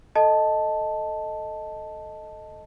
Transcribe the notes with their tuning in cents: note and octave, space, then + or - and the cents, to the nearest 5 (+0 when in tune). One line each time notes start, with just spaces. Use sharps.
A4 +0 D#5 +0 A5 +0